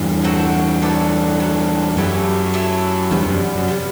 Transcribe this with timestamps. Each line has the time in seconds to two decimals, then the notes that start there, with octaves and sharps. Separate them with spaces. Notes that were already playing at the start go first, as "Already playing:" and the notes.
Already playing: E2 G2
0.24 F#3 C4 F#4 A4
0.82 F#3 B3 D4 A4
1.40 F#3 B3 D4 A4
1.96 F#2 F#3 A3 E4 G4
2.54 F#3 A3 E4 G4
3.11 E2 G2 C3 G3 B3
3.26 F#2
3.55 F#2
3.68 C3 G3 B3